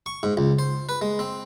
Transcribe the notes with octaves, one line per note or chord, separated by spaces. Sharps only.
C#6
G#2
C#2
C5
B4
G#3
C4